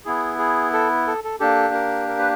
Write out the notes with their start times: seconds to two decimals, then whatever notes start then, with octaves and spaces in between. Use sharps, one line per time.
0.05 B3 E4 G#4
0.38 G#4
0.73 A4
1.07 A4
1.24 A4
1.40 A#3 D4 G4 A4
1.74 A#4
2.08 A#4
2.18 B4